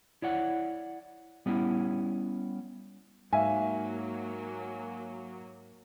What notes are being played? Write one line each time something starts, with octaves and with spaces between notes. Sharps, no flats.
E4 C#5 D5 F#5
G3 B3 C#4 E4
G#2 F#3 A#3 E5 F5 G#5